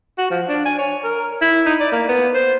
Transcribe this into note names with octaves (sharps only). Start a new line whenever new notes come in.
F#4
F3
D4
G#5
C#5
A#4
E4
D#4
D5
A#3
B3
C5